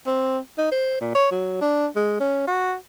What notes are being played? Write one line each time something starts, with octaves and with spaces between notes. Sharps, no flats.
C4
D#4
C5
A#2
C#5
F#3
D4
G#3
C#4
F#4